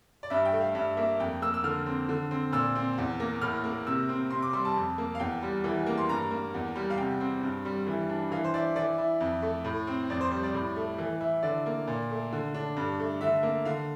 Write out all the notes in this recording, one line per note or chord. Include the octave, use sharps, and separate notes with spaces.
D5
G2 E5
G5
A3
F5
G2 E5
A#3 E5
F2 G5
A#3 E6
E6
D3 F6
C4
D3
C4
A#2 E6
C4
E2
A#3
A2 F6
A#3
C3 E6
C4
C3 C6
D6
G3 C6
A5
F2
A#3
F5
E2 G5
G3
E3
A#3
C6
G2 A#5
A#3
E2
G3
F5
C3 G5
C4
G2
G3
E3
D4
E3 F5
C5
E4 D5
E3 D5
E4
F2
A3
A2
C4
F2 D5
C5
G3 C5
D5
A2
A3
E3
E4
D3 D5
A#3
A#2
A3
D3
D4
G2
A3
D3 E5
A#3
D3 F5